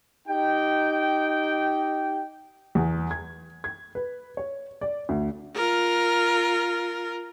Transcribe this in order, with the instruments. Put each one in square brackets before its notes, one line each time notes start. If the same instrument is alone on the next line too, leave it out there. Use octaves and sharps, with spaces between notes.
[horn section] D#4 G4 G5
[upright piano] E2
G#6
G#6
B4
C#5
D5
D2
[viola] F4 A#4